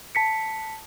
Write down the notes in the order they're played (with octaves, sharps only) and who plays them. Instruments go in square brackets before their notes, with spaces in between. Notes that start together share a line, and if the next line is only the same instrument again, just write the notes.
[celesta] A5 B6 C#7